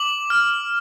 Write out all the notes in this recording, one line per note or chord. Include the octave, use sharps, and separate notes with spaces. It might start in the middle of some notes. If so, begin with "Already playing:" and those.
Already playing: D6 F#7
F6